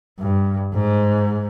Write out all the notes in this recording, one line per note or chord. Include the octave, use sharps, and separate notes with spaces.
G2
G#2